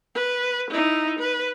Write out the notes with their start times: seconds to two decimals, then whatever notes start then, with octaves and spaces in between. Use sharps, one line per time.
0.15 B4
0.70 D#4 E4
1.19 B4